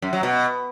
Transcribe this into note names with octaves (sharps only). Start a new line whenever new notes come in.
F#2
F#3
B2